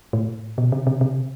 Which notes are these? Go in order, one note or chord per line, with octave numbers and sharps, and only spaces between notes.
A2
B2
C3
C3
C3